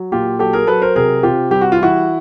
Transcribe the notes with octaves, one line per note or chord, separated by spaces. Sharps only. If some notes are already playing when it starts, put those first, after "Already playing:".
Already playing: F#3
A#2 F4 G4
F#3 G4 A4
G#4 A#4
F#3 A4 B4
A#4 C5
C3 G#4 A#4
C3 F4 G4
G3 G4
F#4
F4
E3 E4 F#4